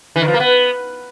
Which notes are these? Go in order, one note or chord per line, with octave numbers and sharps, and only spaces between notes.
E3
D#3
F3
A#3
B3